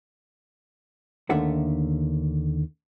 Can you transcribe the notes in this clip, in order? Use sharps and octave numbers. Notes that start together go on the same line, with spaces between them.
D#2 D3 D#3 A3 E5 F#5